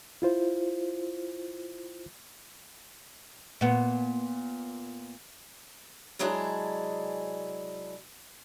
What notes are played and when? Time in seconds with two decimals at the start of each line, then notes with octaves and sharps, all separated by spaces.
0.22 E4 F4 C5
3.61 A#2 B3
6.19 C3 F#3 G#3 D4 E4 G#4